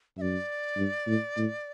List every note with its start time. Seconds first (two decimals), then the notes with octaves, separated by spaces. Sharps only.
0.18 F#2 E5
0.21 D5
0.77 G2
1.07 A2
1.37 A2